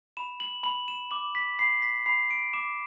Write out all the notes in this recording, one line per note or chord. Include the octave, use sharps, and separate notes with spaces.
B5 E7
F#7
B5 F#7
E7
D6 F#7
B6
B5 C7
B6
B5 C7
D7
D6 E7